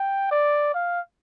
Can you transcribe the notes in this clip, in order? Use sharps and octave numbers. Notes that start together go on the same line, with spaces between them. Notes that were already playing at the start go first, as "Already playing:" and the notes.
Already playing: G5
D5
F5